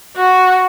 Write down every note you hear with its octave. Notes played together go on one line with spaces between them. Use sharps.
F#4